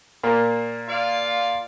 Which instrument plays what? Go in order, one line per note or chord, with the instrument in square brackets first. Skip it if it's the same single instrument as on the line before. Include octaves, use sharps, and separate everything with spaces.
[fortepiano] A#2 A#3
[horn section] F4 D5 F5